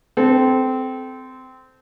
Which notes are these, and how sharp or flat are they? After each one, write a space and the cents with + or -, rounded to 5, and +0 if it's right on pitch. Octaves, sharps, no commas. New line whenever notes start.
C4 -15 A4 -25